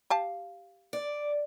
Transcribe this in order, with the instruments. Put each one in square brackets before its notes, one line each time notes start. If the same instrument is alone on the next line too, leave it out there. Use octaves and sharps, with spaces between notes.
[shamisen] G4 F5 A5
[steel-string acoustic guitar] D5